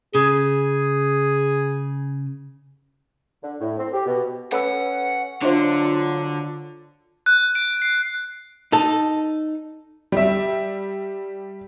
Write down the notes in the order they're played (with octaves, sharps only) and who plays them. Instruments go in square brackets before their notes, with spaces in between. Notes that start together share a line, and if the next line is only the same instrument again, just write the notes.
[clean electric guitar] C#3 [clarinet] G#4
[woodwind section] D3
A2
C4
G4
B2
[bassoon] C#4 [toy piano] A4 B5 E6 [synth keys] B4 [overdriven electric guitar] F#5
[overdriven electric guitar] D3 [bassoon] F#3 [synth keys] D4 F4 [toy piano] C5 E5 C6
[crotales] F#6
D7
C7
[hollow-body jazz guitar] D#4 A4
[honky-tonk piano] G3 E5